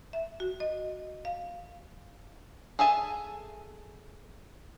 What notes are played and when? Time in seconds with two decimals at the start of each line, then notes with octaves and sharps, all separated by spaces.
0.13 E5
0.40 F#4
0.60 D#5
1.25 F5
2.79 G#4 A4 E5 G#5 A5